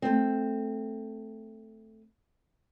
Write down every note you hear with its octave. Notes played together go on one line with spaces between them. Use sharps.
A3 C4